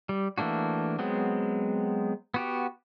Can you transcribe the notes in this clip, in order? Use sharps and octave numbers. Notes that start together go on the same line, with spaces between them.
G3
E3 A3 A#3 D4 F#4
F#3 G#3 B3 C4
B3 F#4 G4